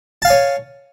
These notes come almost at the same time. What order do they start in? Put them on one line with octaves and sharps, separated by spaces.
A5 F5 G#5 C#5